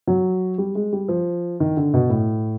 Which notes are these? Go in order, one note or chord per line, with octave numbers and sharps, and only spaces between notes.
F#3
G3
G#3
G3
F3
D#3
D3
B2
A2